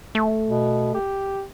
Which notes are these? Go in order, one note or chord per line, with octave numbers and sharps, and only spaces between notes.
A3
B2
G4